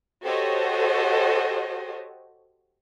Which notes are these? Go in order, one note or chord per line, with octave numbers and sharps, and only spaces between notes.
F#4 G4 A4 C5 C#5 D#5